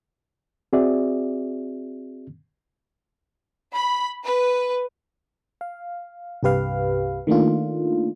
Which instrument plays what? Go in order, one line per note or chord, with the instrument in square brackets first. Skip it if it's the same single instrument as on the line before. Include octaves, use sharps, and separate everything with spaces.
[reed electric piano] C4 F#4 G#4 D5 E5
[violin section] B5
B4
[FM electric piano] F5
C2 G2 G4 B4 F5
D#3 A3 A#3 D4 F4